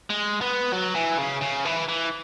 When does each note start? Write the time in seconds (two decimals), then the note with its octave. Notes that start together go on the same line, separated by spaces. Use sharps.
0.10 G#3
0.41 B3
0.73 F#3
0.96 E3
1.19 C#3
1.42 C#3
1.65 E3
1.89 E3